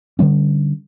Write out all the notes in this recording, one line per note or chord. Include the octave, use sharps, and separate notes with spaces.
D3 E3 G3 C#4